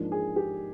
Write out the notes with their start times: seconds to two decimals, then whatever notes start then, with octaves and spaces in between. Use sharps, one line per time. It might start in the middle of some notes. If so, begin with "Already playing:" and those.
Already playing: G#2 F3 A#3 D4
0.12 G#4
0.36 G4